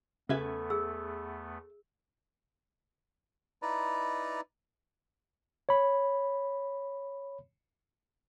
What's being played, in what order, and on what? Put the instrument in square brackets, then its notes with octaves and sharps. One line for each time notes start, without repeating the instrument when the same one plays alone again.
[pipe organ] E2 A3 B3 [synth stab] C#3 G#6 [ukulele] A4 B4 E5
[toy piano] G#4 E6
[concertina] D#4 E4 B4 D5 A#5
[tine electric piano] C#5 B5